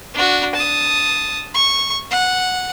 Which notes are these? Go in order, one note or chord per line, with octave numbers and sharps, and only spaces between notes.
D4 F#4
A5 D#6
C#6
F#5